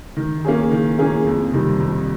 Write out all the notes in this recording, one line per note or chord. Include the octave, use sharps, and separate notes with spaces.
D#3
A#3 C#4 G#4
D#3
A#3 C#4 G#4
F2
C3 D#3 G3
F2